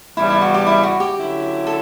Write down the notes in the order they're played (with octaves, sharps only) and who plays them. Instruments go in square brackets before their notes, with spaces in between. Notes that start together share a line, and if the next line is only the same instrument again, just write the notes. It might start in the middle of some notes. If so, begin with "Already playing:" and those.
[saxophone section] E2 C#3 G3 [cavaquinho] E4
[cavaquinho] E4
F#4
G4
E4
F#4
G4
[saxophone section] D3 F#3 C#4 E4
[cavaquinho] A4